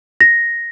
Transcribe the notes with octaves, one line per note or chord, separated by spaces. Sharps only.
A#6